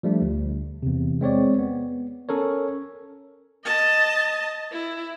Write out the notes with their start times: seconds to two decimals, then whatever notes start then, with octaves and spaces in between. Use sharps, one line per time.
0.03 F3 G3 A3 D4
0.22 D2
0.83 E2 C3
1.21 G#3 C4 C#5 D5
1.59 B3
2.29 C#4 A4 A#4 C#5
3.65 D#5 A5
4.72 E4